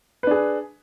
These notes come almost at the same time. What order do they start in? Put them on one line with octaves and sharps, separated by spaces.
B4 D4 G#4